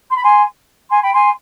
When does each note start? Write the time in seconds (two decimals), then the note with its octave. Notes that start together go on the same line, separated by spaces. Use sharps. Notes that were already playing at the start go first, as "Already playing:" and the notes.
0.09 C6
0.16 B5
0.23 G#5 C6
0.90 G#5 C6
1.01 G5 B5
1.13 G#5 C6